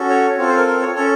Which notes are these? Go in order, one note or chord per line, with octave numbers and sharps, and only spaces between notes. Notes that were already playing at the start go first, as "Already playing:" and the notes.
Already playing: C#4 F#4 A4
C#5
C4 F4 A4 C#5
C5
A#4
A#4
C#5
C#4 A4 C#5